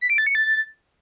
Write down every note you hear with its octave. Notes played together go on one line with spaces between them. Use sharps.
B6
D7
A6
C#7
A6